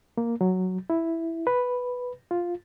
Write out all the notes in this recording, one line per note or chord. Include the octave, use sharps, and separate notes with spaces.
A#3
F#3
E4
B4
F4